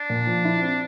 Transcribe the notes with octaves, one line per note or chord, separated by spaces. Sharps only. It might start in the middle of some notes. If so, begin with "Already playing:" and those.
Already playing: D4
A#2
F3
E4
C4